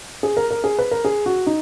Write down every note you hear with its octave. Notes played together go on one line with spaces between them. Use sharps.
G#4
A#4
A#4
G#4
B4
A#4
G#4
F#4
D#4